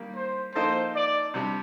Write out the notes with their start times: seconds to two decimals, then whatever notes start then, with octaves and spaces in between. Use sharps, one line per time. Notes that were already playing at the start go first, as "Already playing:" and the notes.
Already playing: D#3 G3 A#3
0.17 C5
0.55 F3 A#3 D#4 A4 C5
0.95 D5
1.34 C3 G3 D4 G4